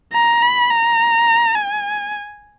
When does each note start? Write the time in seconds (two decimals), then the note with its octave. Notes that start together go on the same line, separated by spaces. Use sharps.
0.13 A#5
0.42 B5
0.70 A#5
1.55 G#5